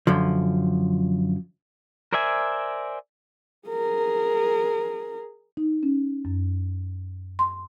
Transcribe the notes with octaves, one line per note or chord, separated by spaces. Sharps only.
F#2 D3 F3
A#4 C5 D5 E5 G#5
G#4 A#4
D#4
C#4
F#2
C6